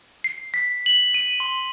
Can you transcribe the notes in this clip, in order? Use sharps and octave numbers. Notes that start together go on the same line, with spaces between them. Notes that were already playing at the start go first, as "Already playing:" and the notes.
C7
B6
F#7
D#7
C6